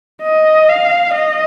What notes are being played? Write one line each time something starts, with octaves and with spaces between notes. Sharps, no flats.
D#5
F5
D#5